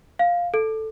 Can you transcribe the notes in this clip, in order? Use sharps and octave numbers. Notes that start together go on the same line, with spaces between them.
F5
A4